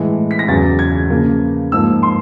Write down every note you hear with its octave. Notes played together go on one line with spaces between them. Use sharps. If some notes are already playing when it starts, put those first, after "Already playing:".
Already playing: A2 E3 G#3
B6
A#6
E2 C#3 F#3 A6
G#6
C#3 F3 A#3
G#2 F3 A#3 E6
C6